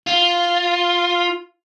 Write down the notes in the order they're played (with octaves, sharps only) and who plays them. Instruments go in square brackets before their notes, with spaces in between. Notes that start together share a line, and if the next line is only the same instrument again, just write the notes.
[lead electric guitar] F4